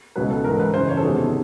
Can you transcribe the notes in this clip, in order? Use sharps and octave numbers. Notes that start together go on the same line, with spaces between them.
C#2 B2 F#3 B4
A4
G#2 E3 A#4
B4
F#2 C#3 E3 C5
C#5
A4
E2 C3 D#3 F#3 G#4